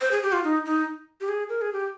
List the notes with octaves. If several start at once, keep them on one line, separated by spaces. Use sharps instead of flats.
C5
G#4
G4
F4
D#4
D#4
G4
G#4
A#4
G#4
G4